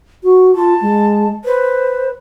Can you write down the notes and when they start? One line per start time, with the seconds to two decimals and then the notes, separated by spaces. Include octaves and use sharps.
0.23 F#4
0.55 F4 A5
0.82 G#3
1.45 B4 C5